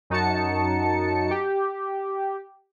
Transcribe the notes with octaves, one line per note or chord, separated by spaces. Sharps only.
F#2 D#4 F#4 A5 C#7
G4